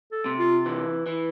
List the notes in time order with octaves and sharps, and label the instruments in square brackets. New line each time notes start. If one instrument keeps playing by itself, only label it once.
[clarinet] A4
[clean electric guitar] C3
[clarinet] F4
[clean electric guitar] E3
E3